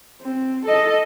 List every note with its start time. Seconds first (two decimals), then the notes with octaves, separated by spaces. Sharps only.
0.22 C4
0.66 A4 D#5